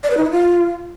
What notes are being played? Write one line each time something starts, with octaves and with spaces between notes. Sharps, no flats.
D5
B4
D#4
E4
F4